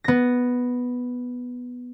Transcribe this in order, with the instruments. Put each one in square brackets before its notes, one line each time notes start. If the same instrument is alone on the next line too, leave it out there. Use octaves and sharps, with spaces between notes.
[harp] B3 A#6